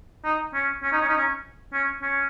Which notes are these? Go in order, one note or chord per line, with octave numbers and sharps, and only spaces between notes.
D#4
C#4
C#4
D#4
C#4
D#4
C#4
C#4
C#4